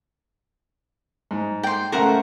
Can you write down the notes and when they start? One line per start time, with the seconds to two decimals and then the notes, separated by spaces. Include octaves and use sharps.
1.31 G#2
1.63 G5 C6
1.92 C#3 A3 A#4 C5 F#5